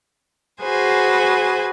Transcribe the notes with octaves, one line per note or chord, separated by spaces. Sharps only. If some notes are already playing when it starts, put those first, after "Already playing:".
F#4 G#4 B4 C5 G#5